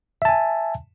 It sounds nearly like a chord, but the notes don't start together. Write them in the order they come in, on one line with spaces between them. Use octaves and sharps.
E5 A5 G#5